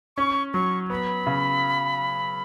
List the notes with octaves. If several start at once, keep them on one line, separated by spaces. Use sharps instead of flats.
C#4 C#6
F#3 C#6
B3 B5
C#3